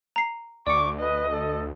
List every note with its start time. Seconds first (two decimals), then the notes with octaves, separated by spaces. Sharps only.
0.16 A#5 C7
0.67 D2 D5 C#6 D6 C#7
1.00 B4 D#5
1.32 A4